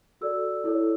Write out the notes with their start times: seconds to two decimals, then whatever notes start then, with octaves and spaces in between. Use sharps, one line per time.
0.21 F#4 A4 D5 E6
0.64 E4 A4 C#5